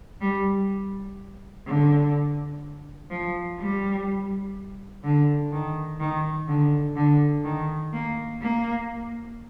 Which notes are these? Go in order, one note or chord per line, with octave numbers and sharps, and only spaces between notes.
G3
D3
F3
G3
D3
D#3
D#3
D3
D3
D#3
A#3
A#3